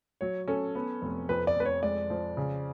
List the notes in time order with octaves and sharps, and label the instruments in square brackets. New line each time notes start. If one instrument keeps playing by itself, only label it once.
[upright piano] F#3 [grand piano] C#5
[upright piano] C#4 [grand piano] A4
[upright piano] B3
F1
[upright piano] F2 [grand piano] B4
[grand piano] D5
[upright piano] F1 [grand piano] B4
[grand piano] C#5
[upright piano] G#3 [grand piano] D5
[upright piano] F3
C#3